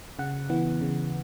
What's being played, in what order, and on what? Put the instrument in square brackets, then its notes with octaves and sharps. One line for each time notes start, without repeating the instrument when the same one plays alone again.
[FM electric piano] C#3 F#5
E3 B3
C#3